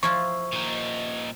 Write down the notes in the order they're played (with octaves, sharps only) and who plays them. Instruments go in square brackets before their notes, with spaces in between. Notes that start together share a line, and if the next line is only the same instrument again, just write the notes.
[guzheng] F3 E4 F4 [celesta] C#6
[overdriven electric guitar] A#2 D#4